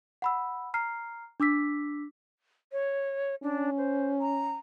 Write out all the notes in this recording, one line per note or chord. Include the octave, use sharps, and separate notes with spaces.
F#5 B5 E6
A#5 F6 C7
D4 D6 E6 B6
C#5
C#4 D4
C5
A#5